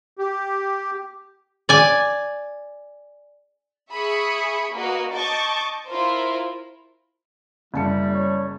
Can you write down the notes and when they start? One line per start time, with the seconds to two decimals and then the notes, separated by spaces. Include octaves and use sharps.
0.19 G4
1.69 D5 G#5
3.92 G#4 E5 B5 C#6 D#6 C#7
4.73 A#3 F#4 B4 D#5
5.13 D#5 A5 C#6 D6 G6 A6
5.88 E4 F4 A#4 C5
7.74 F#1 G3 E4 A5 C#7
8.14 C#5